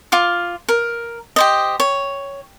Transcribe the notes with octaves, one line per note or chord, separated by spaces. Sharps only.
F4 F5 D6
A#4
G4 C5 D#5
C#5